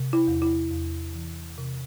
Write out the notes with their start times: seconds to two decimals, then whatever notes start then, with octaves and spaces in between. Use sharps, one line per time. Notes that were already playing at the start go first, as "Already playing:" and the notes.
Already playing: C3
0.13 E4
0.27 E2
0.42 E4
0.71 E2
1.14 E3
1.58 C3